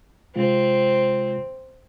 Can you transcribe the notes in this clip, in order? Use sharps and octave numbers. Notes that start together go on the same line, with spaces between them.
C3 G#3 C4 F4